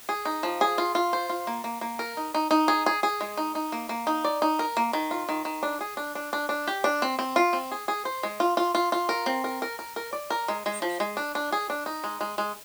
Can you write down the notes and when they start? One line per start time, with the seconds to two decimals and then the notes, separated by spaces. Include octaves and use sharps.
0.09 G#4
0.25 D#4
0.43 F3
0.61 G#4
0.78 F4
0.95 F4
1.13 C5
1.29 F4
1.47 A#3
1.64 A#3
1.81 A#3
1.99 A#4
2.17 D#4
2.34 D#4
2.51 D#4
2.68 G#4
2.86 G#4
3.03 G#4
3.21 G#3
3.37 D#4
3.55 D#4
3.72 A#3
3.89 A#3
4.07 D#4
4.24 D5
4.42 D#4
4.59 A#4
4.77 A#3
4.93 D#3
5.11 F4
5.29 D#3
5.45 D#3
5.63 D4
5.81 G#4
5.97 D4
6.15 D4
6.33 D4
6.49 D4
6.67 G4
6.84 D4
7.02 C4
7.19 C4
7.36 F4
7.53 C4
7.71 G#4
7.88 G#4
8.05 C5
8.23 G#3
8.40 F4
8.57 F4
8.75 F4
8.92 F4
9.09 A#4
9.26 C4
9.44 A#4
9.62 A#4
9.79 A#4
9.96 A#4
10.13 D5
10.30 A#4
10.48 G#3
10.66 G#3
10.82 F3
11.00 G#3
11.17 D4
11.35 D4
11.52 G#4
11.70 D4
11.86 D#4
12.04 G#3
12.21 G#3
12.38 G#3